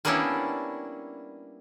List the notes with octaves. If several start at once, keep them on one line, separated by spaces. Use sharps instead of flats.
G3 A#3 B3 C#4 D4 E4